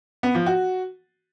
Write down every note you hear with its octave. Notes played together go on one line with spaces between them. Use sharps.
B3
F3
F#4